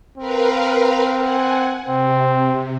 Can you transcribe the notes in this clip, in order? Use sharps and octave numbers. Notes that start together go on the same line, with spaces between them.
C4 A#4 B4 F5
F#5 G#5
C3 C4